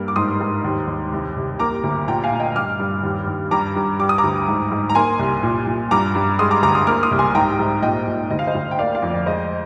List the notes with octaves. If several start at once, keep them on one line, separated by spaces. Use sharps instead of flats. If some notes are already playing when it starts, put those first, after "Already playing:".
Already playing: G2 A#3
D6
G#2 C6 D#6
G#2
D#2
D#2
C2
C2
A#3 A#5 D6
D2
A#2 G5 A#5
F5 G#5
A#2
D#5 G5
G2 D6 F6
G2
D#2
D#2
G2 A#5 D6
G2
G3 D6
D#6
A#5 D6
D2
G#2
G#2
A#5
A#3 G#5 C6
C2
A#2
A#2
G2 A#5 D6
G2
G#3 C6 D#6
A#5 D6
D2 A#5 D6
C6 D#6
A#3 D6 F6
C6 D#6
C2
G#5 C6
G#2 G5 A#5
G#2
A#2 D#5 G5
A#2
D2 D#5
F5
C5 D#5
D2
G5
A#3 D5 F5
D5 F5
F2
D5
G#3 C5 D#5